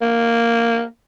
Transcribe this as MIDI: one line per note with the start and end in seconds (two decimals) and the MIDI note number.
0.02 0.85 58